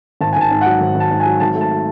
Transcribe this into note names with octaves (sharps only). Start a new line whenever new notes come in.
G#1 A5
G#5
G#1 A5
G#2
F#5
F#3
G#1
G#1
A5
G#2
G#5
F#3
G#1 A5
A3
A5